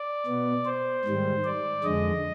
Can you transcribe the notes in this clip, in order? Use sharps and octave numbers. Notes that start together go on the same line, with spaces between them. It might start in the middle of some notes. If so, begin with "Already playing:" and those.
Already playing: D5
B2 B3
C5
G#2 D#3 G3
D5
F2 D3 G#3 D#5